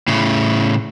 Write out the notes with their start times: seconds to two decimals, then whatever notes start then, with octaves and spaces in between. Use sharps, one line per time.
0.08 A2 C#3